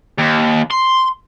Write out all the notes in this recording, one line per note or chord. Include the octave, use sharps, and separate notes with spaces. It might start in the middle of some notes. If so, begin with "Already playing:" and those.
D#2
C6